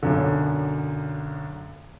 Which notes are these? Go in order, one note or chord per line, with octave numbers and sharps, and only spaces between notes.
B1 F#2 D3